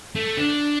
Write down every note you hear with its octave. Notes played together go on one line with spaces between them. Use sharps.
A3
D4